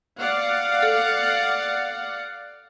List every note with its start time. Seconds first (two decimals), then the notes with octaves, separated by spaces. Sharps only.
0.19 D5 F5 F#5
0.83 A4